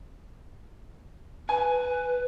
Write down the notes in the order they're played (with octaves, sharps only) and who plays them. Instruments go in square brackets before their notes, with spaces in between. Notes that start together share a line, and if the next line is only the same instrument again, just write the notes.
[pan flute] B4 [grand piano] G#5